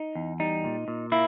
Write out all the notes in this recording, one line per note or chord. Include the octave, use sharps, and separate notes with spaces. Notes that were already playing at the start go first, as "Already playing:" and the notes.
Already playing: D#4
E2
G3 D#4
A#2
A#2
A#3 E4